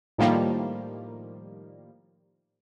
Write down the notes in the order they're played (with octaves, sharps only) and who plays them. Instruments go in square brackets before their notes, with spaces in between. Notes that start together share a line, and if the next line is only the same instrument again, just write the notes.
[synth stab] A2 D#3 F3 G3 A#3